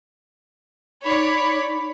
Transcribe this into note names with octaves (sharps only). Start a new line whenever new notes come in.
D#4 C#5 D5 B5